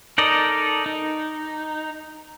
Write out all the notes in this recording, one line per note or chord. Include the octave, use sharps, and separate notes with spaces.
D#4 A4 A#4 D5 D#5
D#4